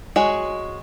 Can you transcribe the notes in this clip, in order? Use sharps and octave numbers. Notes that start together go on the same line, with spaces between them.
G#3 F#4 C#5